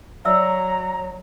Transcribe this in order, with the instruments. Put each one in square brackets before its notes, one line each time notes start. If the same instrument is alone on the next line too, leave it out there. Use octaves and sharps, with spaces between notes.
[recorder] F#3 [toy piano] D5 E5 E6 [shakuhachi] A#5